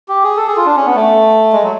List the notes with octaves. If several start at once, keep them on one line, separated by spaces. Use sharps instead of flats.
G4
G#4
A4
G#4
F4
D4
C#4
B3
A3
G#3
F#3